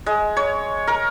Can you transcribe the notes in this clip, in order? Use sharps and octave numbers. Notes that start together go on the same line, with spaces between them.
G#3
C#5
A#4